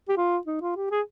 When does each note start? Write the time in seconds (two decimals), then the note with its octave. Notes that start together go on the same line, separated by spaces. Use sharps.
0.09 G4
0.17 F4
0.47 D#4
0.62 F4
0.76 G4
0.91 G#4